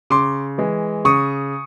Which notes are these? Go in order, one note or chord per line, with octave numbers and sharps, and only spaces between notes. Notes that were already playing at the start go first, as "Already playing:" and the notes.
C#3 C6 D6
E3 G#3
C#3 C#6 D#6